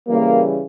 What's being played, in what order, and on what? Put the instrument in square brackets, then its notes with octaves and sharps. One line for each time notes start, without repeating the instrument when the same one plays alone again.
[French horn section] C#3 E3 G3 A#3